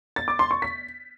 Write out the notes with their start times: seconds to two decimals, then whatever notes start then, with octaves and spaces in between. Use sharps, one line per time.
0.16 A6
0.28 D6
0.39 C6
0.51 C#6
0.62 B6